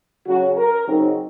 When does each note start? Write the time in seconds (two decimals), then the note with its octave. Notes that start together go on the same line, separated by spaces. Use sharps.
0.26 C#3 F#3 C#4 F#4
0.57 A#4
0.87 C#3 F#3 C4 D#4